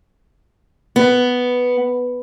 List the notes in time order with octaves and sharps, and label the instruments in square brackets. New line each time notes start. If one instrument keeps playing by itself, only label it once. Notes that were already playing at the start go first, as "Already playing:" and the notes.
[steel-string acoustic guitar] B3